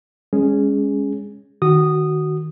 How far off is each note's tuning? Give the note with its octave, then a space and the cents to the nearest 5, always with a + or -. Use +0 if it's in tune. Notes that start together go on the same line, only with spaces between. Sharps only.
G#3 -25 C#4 +0 G#4 +0
D#3 -15 F#4 +10 D#6 -10